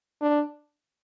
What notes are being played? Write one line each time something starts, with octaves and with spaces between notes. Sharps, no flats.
D4